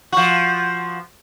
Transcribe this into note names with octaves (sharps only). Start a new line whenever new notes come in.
F3 F#4